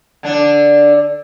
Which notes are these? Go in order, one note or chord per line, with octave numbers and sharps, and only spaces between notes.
D3 D4